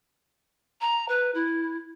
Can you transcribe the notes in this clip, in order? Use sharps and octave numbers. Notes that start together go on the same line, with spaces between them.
A#5
B4
E4